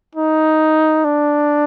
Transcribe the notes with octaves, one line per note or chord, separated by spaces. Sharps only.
D#4
D4